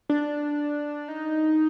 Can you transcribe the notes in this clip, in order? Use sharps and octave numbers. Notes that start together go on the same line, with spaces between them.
D4
D#4